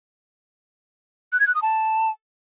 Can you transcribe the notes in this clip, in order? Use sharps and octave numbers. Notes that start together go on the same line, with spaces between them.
F#6
G#6
F#6
D#6
A5